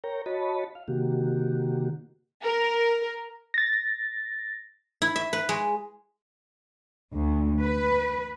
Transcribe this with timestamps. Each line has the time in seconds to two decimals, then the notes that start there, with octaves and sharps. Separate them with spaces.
0.04 A#4 C#5 G5 A#5
0.26 F#4 C#5 D#5 A5 B5
0.75 F5
0.88 C3 D#3 A#3 F#4 G4
2.43 A#4
3.54 A6 A#6
5.02 E4
5.16 E5
5.33 B4
5.49 G#3
7.14 D2
7.62 B4